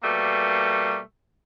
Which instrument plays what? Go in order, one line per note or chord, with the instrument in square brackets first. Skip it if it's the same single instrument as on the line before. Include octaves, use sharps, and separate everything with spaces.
[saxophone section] B2 G3 A3 A#3